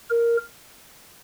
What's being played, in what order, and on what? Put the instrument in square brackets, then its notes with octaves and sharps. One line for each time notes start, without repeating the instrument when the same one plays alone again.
[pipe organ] A#4